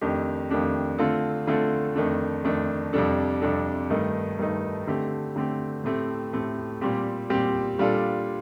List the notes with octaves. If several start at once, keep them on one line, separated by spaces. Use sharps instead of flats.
F2 D#3 A3 D4 G4
F2 D#3 A3 D4 G4
D3 A3 C4 F4 A4
D3 A3 C4 F4 A4
F2 D#3 A3 D4
F2 D#3 A3 D4
F2 C3 G3 D4 A4
F2 C3 G3 D4 A4
G2 D#3 A3 D#4
G2 D#3 A3 D#4
D3 A3 C4 G4
D3 A3 C4 G4
A2 A3 C4 G4
A2 A3 C4 G4
A#2 G3 C4 G4
A#2 G3 C4 G4
A#2 G3 D4 F4 A4